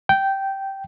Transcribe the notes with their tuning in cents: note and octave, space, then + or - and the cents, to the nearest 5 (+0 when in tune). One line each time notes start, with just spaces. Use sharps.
G5 -10